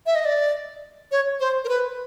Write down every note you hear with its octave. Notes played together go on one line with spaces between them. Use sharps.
E5
D#5
D5
C#5
C5
A#4
B4